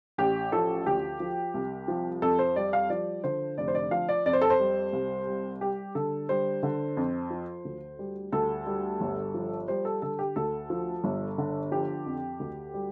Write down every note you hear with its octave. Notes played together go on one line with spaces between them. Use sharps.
A1 G4
F3 A4
D2 G4
F3
C2
F3
F2 A4
C5
G3 D5
F5
F3 D5
D3 C5
F1 D5
C5
D5
F3 F5
D5
F2 D5
C5
A4
C5
G3
C2
G3
G3 G4
D3 A4
G3 C5
D3
F2
F3
D2
G3
D2 A4
G3
G1
F3
G3 C5
A4
D3 A4
G4
D2 A4
F3
G1
D3
F3 G4
F2
D2
G3